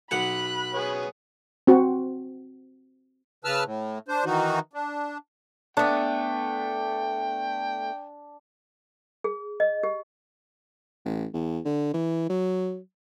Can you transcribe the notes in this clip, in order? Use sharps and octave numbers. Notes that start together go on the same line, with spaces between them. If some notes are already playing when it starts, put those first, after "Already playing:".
B1 F#5 B5 F#6
B3 G#4 C#5
C4 F#4
C#3 B4 A5 E6 F6
A2
D4 C5
D#3 E3 D#4 F#4
D4
A3 B3 D4 G5
G#4
D#5
G4
A1
E2
D3
E3
F#3